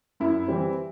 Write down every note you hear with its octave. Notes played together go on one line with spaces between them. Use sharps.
F#2 E4
E3 G3 C4